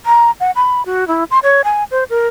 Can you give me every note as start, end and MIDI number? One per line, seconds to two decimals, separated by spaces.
0.06 0.31 82
0.40 0.51 78
0.56 0.85 83
0.86 1.07 66
1.08 1.24 64
1.31 1.39 84
1.43 1.62 73
1.64 1.84 80
1.91 2.04 72
2.10 2.27 70